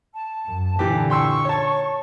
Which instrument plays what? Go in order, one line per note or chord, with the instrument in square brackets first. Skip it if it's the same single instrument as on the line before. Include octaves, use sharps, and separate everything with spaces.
[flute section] A5
[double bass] F#2
[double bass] A#2 D3 [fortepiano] E3 G4
[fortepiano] G5 C6 E6 [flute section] C#6
[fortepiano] C#5 A5